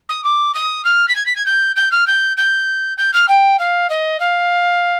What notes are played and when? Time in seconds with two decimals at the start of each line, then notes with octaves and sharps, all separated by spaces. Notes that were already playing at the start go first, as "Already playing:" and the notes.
0.09 D#6
0.24 D6
0.54 D#6
0.84 F6
1.08 B6
1.15 G#6
1.26 B6
1.36 G#6
1.46 G6
1.76 G6
1.91 F6
2.07 G6
2.37 G6
2.97 G6
3.13 F6
3.28 G5
3.59 F5
3.90 D#5
4.20 F5